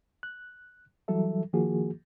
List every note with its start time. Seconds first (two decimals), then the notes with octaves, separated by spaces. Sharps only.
0.23 F#6
1.08 E3 F#3 G3 A4 E5
1.53 D#3 F3 A#3 F#4 G#4